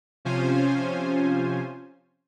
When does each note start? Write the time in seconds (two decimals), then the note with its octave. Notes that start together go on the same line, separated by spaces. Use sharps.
0.25 C3 F3 C#4 F4 C5 G#5